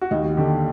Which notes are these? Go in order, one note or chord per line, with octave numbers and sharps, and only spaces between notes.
F#4
D#2 D#4
D3 G4